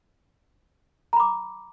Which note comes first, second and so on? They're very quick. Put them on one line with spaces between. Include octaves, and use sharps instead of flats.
A#5 B5 D6